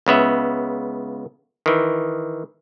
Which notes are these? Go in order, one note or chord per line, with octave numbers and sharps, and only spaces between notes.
C#2 C#3 B3 E5
D#3 E3